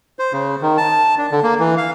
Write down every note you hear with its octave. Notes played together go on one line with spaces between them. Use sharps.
C5
C#3
D#3
A5
D4
D3
A#3
E3
F5